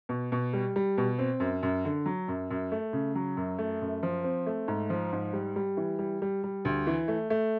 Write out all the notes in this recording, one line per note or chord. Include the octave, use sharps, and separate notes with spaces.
B2
B2
G3
G3
B2
C4
F#2
F#2
D3
F#3
F#2
F#2
A3
C#3
F#3
F#2
A3
F#2
F3
C4
A3
G#2
F3
G#2
G3
G3
E3
G3
G3
G3
D2
E3
A3
A3